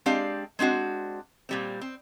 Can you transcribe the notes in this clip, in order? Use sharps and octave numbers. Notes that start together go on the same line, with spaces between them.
G#3 C4 D4 G4 D5 F5
G#3 C4 D4 F#4
A#2 G3 C4
C4